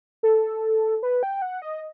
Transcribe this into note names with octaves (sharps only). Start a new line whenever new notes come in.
A4
B4
G5
F#5
D#5